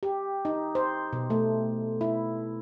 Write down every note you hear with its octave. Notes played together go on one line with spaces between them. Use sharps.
G4
D#4
C5
B2
A3
E4